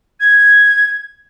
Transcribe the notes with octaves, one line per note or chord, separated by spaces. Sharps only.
G#6